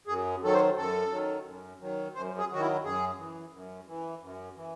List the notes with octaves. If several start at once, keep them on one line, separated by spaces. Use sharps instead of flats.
F#2 G#4
D#3 F#3 A4
C5
F#2 A4
D#3 F#3
F#2
D#3 F#3
F#2 C5
G#4
D#3 F#3 F#4
E4
F#2 G#4
E3
F#2
E3
F#2
E3